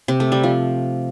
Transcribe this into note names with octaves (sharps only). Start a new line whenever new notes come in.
C3
A3
G3
F3